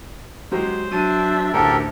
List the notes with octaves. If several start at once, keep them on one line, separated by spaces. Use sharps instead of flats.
F#3 G#3 G4 C5
F#3 D4 E5 D#7
A1 D2 G4 A4 A#4 C5